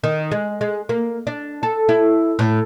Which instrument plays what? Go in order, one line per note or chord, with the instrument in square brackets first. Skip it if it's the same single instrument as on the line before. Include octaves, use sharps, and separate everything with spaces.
[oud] D#3
G#3
G#3
A#3
D4
A4
E4
A2